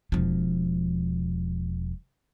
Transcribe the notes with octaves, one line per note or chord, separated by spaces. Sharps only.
E1 F3